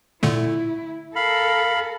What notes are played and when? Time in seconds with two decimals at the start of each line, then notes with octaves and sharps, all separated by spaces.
0.23 A#2 D3 A3 E4
1.16 A4 A#4 F5 B5